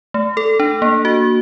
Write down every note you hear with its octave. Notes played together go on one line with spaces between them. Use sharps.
A3
A4
D4
A#3
F#4